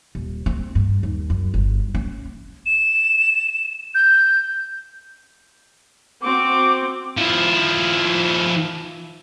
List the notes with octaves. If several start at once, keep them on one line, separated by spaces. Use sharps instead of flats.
D#1
C4
G2
D#2
F#2
G1
C#4
E7
G6
C4 F#4 D6
F3 E4